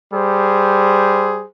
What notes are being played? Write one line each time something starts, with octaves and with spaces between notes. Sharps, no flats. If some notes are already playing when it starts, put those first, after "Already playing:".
G3 G#4 C5